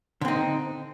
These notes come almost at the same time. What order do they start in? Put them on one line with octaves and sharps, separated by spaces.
D3 C4 D#4